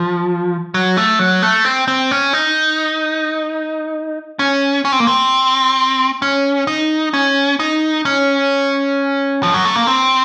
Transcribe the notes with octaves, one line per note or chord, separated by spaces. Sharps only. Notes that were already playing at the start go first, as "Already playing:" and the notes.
Already playing: F3
F#3
A3
F#3
A3
C4
C4
C#4
D#4
C#4
C#4
C4
A#3
C4
C#4
D#4
C#4
D#4
C#4
F3
F#3
A3
A#3
C4